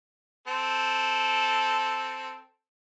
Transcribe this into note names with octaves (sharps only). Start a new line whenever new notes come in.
C4 A4